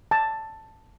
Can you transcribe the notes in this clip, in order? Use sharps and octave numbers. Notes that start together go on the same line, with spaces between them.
A5